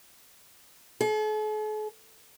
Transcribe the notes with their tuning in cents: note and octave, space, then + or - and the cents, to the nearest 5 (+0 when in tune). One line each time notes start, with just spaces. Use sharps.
A4 -45